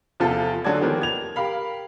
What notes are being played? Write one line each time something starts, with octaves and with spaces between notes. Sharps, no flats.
E2 C3 F3 F4 A4 A6
D3 F#3 G#3 A4 D5 G#6
D#3 F3 A#3 B3 G4
G#6 F7
G4 A#4 F5 B5